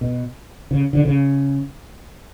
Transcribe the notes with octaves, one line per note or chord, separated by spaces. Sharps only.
B2
C#3
D3
C#3